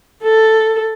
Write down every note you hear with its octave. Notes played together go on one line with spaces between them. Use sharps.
A4